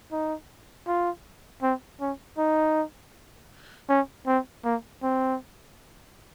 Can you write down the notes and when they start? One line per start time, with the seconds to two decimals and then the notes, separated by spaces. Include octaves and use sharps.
0.12 D#4
0.87 F4
1.63 C4
2.01 C#4
2.38 D#4
3.89 C#4
4.27 C4
4.64 A#3
5.02 C4